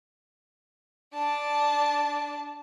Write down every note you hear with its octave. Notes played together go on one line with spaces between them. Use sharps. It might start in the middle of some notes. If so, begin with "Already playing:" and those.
D4 A5